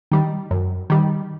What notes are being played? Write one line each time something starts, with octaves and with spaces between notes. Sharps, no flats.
D#3 G3
F#2
D#3 G3